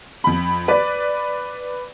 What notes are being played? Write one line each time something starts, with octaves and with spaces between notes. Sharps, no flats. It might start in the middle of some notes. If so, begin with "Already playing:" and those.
F2 B5
B4 D5